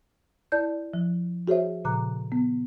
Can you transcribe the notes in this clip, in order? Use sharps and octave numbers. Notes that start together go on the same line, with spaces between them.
E4 D5 A5 G6
F3
F#4 G#4 C5 C#5 E5
A#2 C#3 F3 A#5 D6 F#6
B3